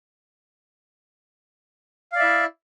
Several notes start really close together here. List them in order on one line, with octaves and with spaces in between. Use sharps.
F5 D5 E5 E4